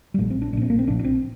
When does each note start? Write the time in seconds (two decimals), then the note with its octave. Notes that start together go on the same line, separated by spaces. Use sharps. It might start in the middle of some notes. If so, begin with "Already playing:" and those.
0.14 G3
0.18 A#1 A#2 A3
0.30 C4
0.42 D4
0.53 A#1 D4
0.57 A#2 C4
0.70 A#3
0.79 C4
0.87 A#1 A#2 D4
0.99 D4
1.04 C4